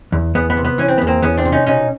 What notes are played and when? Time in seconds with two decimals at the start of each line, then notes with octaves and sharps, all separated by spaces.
0.12 E2
0.35 E2 B3
0.50 B3
0.57 C3
0.65 B3
0.78 E3 C#4
0.88 C4
0.98 E2 B3
1.07 A#3 C4
1.22 E2 B3 C#4
1.38 C4 D4
1.45 C3
1.52 C#4 D#4
1.66 B2 C#4 D#4